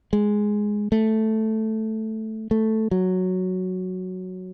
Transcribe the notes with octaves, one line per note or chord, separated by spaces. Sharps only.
G#3
A3
A3
F#3